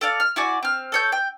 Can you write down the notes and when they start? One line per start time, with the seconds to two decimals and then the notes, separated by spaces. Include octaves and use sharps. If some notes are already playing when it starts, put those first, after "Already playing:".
0.01 A4 D5 F5
0.20 F6
0.36 E4 F#4 D5 G#5
0.63 C4 F6
0.92 A4 C#5 G6
1.12 G5